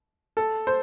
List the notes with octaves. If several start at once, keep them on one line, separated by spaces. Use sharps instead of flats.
A4
C5